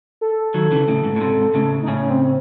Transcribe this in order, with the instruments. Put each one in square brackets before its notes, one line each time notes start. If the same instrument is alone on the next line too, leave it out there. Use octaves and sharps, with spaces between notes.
[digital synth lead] A4
[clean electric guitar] D#3 F#3
C#3 E3
A2 C#3
G#2
A2
G#2 C3
A2 C#3
[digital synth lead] D#4
[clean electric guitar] A2 C#3 [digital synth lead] C#4
[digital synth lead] C4